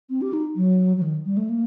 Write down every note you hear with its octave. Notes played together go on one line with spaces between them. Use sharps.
C4
G4
D#4
F#3
F#3
D#3
G3
A3
A#3